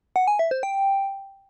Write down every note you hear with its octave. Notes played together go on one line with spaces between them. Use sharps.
F#5
G#5
E5
C5
G5